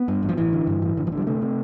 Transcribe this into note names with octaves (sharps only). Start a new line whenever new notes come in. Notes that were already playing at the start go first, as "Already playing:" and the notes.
Already playing: B3
G2
A1
F3
A1 E3
D3
G2
A1
A1 D3
F3
D3
G3
C3 A3
C3